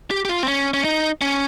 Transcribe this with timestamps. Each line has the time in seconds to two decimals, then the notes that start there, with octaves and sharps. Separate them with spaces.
0.11 G4
0.25 G4
0.29 F4
0.43 C4
0.48 C#4
0.74 C#4
0.84 D#4
1.21 C#4